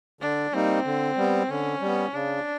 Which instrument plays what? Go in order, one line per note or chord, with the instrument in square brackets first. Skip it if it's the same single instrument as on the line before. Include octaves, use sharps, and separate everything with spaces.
[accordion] D3 [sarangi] D4
[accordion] G3 A#3 D#4 [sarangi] C4
[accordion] D3
G3 B3
[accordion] D3 [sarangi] C#4
[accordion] G3 B3
[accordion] C#3 [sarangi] D4